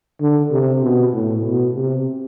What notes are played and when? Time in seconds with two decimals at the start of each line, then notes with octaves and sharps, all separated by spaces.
0.22 D3
0.51 C3
0.83 B2
1.13 A2
1.43 B2
1.74 C3